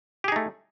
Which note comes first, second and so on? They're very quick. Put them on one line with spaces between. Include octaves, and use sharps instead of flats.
G4 G#4 D#4 A3